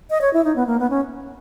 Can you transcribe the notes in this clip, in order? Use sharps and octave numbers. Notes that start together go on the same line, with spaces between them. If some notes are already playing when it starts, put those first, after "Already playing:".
D#5
C#5
E4
D#4
B3
A#3
B3
C#4